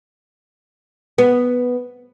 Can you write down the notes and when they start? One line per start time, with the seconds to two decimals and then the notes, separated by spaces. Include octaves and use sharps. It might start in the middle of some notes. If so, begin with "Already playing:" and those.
1.18 B3